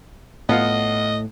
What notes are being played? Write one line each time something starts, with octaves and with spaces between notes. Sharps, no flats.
A2 B3 F4 D#5